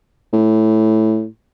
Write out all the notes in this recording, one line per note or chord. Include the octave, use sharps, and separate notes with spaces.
A2